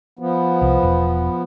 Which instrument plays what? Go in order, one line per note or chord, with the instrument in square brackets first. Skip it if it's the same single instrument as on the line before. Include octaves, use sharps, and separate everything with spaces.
[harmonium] F3 B3
[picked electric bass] C2
E1